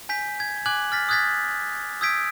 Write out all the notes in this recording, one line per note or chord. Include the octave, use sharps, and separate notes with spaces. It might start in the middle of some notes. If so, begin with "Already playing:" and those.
G#5 G6 B6
G#6
G#5 D6 F#6 G#6 F#7
F6 A6 B6
D#6 F6 F#6 G#6 A6 B6
D#6 E6 G6 G#6 B6 D7